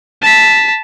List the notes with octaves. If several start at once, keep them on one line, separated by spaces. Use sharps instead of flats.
A5 B6